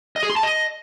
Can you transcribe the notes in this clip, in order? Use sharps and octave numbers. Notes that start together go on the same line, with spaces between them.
D#5
G#4
C6
A5
D#5